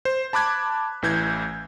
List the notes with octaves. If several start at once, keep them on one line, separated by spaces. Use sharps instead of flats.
C5
A5 B5 D6 F#6 G#6
A1 E3 G6 G#6